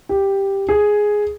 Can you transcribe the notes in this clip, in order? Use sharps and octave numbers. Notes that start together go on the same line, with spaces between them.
G4
G#4